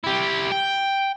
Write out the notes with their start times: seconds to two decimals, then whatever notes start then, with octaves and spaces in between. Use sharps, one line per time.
0.04 E4 G4
0.52 G5